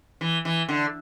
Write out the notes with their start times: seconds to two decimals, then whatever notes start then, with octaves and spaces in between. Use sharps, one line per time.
0.21 E3
0.45 E3
0.69 D3